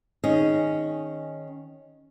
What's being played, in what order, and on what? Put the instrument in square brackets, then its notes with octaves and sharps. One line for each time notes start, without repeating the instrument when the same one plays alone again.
[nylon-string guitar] D#3 C#4 G#4 D#5